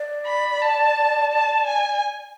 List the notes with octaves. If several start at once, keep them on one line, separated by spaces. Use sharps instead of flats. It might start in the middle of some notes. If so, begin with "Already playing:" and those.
Already playing: D5
B5
A5
A5
G#5